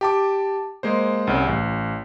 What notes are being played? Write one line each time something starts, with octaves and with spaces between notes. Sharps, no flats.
G4 A5 D6
G#3 A#3 C5
C2 C#3
A1